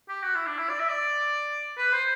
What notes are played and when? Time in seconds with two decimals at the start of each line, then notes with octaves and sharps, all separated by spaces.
0.09 G4
0.23 F#4
0.35 E4
0.46 D4
0.58 E4
0.69 D5
0.80 E5
0.89 D5
1.77 B4
1.93 C5